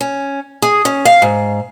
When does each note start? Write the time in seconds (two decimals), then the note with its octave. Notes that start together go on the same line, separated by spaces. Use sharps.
0.01 C#4
0.62 G#4
0.85 C#4
1.05 F5
1.22 G#2